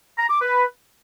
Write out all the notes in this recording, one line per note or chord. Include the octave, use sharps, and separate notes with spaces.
A#5
D6
B4